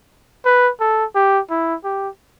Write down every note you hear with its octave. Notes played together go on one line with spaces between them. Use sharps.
B4
A4
G4
E4
G4